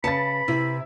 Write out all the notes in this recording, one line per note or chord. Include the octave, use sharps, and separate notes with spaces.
C#3 B4 A5 B5 A6 C#7
C3 E4